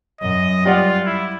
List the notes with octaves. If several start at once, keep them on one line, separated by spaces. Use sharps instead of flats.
F#2 D#5
G3 F4 D5 F#5
E4